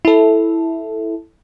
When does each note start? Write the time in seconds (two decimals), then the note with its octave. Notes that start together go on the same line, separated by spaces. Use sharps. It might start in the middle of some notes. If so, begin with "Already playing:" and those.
0.05 E4 A4